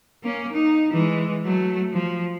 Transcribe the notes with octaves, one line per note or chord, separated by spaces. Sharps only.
A#3 C#4
D#4
E3 G#3
F#3 A3
F3